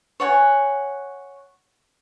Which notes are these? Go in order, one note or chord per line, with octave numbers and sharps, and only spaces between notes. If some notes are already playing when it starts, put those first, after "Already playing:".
C#5 F#5 G#5